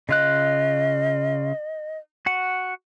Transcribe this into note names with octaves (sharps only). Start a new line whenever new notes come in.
C#3 F4 D#5 F#6
F#4 F#5